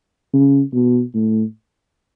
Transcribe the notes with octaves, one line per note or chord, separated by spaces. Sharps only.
C#3
B2
A2